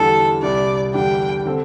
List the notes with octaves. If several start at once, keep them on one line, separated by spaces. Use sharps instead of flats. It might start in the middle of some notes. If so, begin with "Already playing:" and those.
Already playing: E2 D3 G3 E4 A4
C2 C3 G3 D4 D5
E2 D3 G3 D4 G4 G5
D3 C4 A4 C5